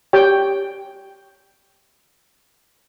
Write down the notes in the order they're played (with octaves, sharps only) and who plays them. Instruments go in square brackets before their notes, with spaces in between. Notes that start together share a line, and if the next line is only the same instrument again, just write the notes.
[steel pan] G4 C#5 G5